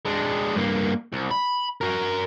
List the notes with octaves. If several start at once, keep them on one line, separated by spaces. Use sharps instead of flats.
G#3 D4
G2 A#3
C2
B5
F#4 A#4